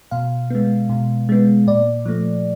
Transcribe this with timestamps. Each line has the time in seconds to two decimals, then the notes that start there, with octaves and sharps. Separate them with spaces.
0.11 B2 F5
0.50 G#3 B3
0.89 B2
1.29 G#3 B3
1.67 A#2 D5
2.06 F3 A3